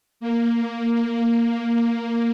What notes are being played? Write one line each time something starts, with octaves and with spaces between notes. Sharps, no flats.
A#3